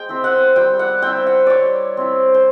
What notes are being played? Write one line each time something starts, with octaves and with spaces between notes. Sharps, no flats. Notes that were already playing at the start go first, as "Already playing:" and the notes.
Already playing: G#3 G5
C4 E4
F#5
G3 G5
F#5
C4 E4 G5
F#5
G3 C#5 D5
C4 E4
C5